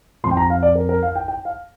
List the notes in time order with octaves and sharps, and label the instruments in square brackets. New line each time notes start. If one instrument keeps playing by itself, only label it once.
[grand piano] F2 F3 C6
G5
A#5
F5
D5
A#4
A#4
F5
G5
G5
F5